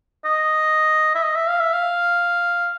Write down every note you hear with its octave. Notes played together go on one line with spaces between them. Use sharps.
D#5
E5
D#5
E5
F5
E5
F5